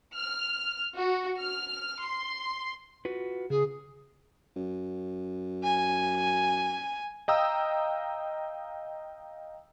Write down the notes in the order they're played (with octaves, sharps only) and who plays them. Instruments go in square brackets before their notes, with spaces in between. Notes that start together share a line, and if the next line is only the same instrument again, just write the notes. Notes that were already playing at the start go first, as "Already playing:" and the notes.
[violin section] F6
F#4
F6
C6
[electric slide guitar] F4 F#4 B4
[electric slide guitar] C#3 [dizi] G#4
[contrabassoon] F#2
[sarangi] G#5
[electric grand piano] D#5 F5 G5 A#5 D#6 E6